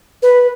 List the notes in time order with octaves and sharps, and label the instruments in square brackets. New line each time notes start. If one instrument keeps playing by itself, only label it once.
[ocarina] B4